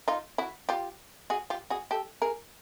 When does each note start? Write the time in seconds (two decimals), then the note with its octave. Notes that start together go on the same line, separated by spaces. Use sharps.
0.08 D#4 F4
0.38 E4 F#4
0.69 F4 G4
1.30 F#4 G#4
1.50 F4 G4
1.70 F#4 G#4
1.91 G4 A4
2.22 G#4 A#4